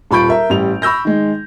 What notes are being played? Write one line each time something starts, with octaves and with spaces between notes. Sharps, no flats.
D#1 F4 B5 C#6 G6 D7
A#4 E5 A#5
A1 G3 F7
B5 C#6 E6 G6 A#6
D#3 G#3